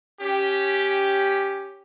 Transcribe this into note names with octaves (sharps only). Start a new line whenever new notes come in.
C#4 G4